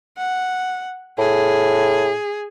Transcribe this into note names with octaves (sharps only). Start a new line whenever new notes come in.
F#5
A2 G#4